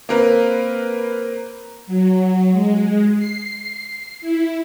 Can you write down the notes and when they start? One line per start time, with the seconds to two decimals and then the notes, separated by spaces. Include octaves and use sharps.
0.09 A#3 C4 A#4 B4
1.87 F#3
2.51 G#3
3.18 C7
4.21 E4